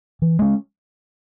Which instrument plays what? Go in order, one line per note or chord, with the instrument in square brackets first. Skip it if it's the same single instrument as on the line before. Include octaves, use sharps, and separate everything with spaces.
[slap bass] E3
G#3 C#4